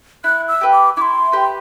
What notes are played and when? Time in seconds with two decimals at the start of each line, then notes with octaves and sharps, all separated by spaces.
0.24 E4 F#6
0.48 E6
0.61 G4 B4
0.73 D6
0.97 E4 C6 D6
1.32 G4 B4